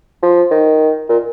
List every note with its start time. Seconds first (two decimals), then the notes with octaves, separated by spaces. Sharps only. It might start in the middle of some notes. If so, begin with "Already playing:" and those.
0.23 F3
0.51 D#3
1.09 A#2